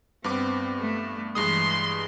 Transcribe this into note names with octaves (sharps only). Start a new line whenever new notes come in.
G2 B3 C4 D6
A3
G2 E3 G#3 C6 D#6